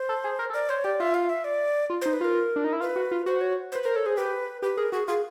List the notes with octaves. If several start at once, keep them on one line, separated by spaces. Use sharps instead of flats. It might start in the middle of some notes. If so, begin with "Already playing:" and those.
Already playing: C5
A4
G#4
A#4
A4
A#4 D5
C5 C#5
G4 D5
F4 E5
F5
E5
D5
F4
D#4 C5
B4
F4 A#4
D4
D#4
E4
F4 B4
F#4
F4
F#4 C5
C#5
C5
B4
A#4 C5
A4 C#5
G#4 C5
G4 B4
G4 B4
G#4 A#4
F#4 G#4
F4 G#4